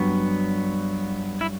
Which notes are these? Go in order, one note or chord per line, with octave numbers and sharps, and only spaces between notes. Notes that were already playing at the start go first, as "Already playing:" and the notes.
Already playing: G2 F#3 B3
E4